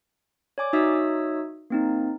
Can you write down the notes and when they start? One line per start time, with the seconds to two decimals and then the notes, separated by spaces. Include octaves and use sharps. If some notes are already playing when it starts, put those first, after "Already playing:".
0.58 C#5 D5 G#5 D6
0.73 D#4 F#4 C#5 E5 D#6 E6
1.70 A#3 C4 D#4